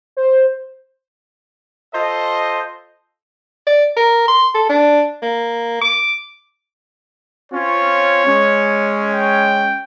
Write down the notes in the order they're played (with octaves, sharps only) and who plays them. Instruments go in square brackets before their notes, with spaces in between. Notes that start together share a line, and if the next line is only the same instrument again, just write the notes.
[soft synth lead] C5
[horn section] F4 A4 C5 D#5
[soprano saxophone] D5
A#4
C6
A4
D4
A#3
D6
[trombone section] C4 C#4 F4 [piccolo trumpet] C#5
[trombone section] G#3 C#4
[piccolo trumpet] G5